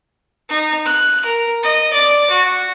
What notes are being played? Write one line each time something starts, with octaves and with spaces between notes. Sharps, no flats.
D#4
F#6
A#4
D#5
D5
F#4